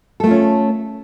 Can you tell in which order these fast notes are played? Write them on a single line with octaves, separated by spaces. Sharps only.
A4 A3 F4 C#4